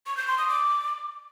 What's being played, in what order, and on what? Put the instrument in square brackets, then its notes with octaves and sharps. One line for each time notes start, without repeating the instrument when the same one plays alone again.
[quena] C#6
G6
C6
D#6
D6